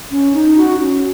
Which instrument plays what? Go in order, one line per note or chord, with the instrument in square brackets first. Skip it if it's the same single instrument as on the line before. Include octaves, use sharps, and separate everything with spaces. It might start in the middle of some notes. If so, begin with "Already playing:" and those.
[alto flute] C#4
D#4
F#4
C#4